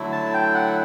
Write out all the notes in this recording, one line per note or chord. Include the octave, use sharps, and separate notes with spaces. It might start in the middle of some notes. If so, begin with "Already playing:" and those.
Already playing: D3 F#3 A3 E4
A5
G5
F#5